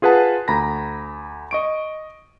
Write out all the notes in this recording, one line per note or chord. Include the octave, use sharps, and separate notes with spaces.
F4 G#4 B4 F#5 A5
D2 A#5 B5 A#6
D#5 C#6 D7